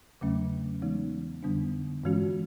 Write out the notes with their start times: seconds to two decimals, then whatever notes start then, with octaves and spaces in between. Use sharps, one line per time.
0.21 E2 C#3 F#3 A3 C#4
0.82 E3 G#3 B3 D#4
1.43 F2 D3 G3 B3 D4
2.04 G2 E3 G#3 C#4 F#4